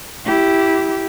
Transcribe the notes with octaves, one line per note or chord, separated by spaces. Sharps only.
E4 G4